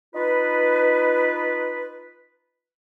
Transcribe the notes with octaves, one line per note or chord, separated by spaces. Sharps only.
D#4 F4 B4